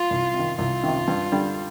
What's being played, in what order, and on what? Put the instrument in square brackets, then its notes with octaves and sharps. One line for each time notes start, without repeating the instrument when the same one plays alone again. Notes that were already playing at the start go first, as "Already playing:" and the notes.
Already playing: [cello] F4
[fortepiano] C2
C3
D#3
[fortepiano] C2 [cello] F4
[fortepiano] C3 D#3
G2
D3 G3